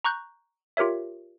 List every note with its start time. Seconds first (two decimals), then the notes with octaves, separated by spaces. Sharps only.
0.05 A#5 C#6 F#6 G6
0.77 F4 G4 A#4 C#5 E5